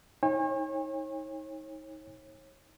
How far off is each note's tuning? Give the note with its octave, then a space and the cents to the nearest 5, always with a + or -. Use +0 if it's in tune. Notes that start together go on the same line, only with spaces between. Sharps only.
D#4 +30 C#5 -35 G#5 -45